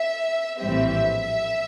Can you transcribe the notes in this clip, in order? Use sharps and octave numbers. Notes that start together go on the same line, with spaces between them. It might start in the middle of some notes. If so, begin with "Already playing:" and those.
Already playing: E5
A#1 A2 E3 G3 C4 E5